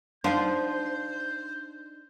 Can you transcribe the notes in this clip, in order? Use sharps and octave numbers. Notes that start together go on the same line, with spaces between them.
F3 D4 D#4 C5 F#5 G6